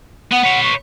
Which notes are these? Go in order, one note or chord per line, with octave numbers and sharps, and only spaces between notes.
B3 F#5
B4 C#5
C#6